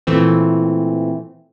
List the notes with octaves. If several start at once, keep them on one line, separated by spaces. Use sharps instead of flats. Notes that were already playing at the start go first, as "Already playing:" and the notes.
A#2 E3 A3 C4